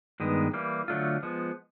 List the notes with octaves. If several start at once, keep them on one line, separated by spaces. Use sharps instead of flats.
G2 D#3 G#3 B3
E3 G3 A#3
D3 F#3 A3 D4 F4
F3 G#3 B3